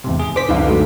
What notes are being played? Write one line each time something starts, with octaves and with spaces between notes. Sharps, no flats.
E2 G#2 C3
G#4
C5 D6 B6
C#2 F#2 D3 D#4 B4 F5
F#3 G#3 A3